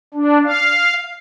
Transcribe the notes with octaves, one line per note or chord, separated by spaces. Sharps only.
D4
F5